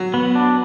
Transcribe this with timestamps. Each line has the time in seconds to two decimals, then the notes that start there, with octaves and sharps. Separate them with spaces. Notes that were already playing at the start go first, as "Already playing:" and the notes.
Already playing: F#3
0.14 B3
0.35 D4